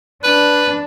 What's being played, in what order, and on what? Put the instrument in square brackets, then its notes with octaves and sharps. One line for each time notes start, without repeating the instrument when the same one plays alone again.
[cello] D4 [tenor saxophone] B4